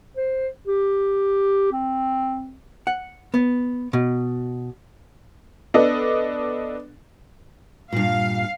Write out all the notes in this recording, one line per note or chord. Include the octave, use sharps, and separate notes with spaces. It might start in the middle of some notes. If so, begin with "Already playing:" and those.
C5
G4
C4
F#5
B3
B2
B3 D4 A4 D#5
G2 A#2 F5